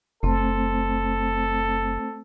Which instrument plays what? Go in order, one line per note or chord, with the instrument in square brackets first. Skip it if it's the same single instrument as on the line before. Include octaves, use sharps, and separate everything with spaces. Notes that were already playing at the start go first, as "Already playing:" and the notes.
[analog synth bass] F#1 [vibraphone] A3 C4 C5 [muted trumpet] A4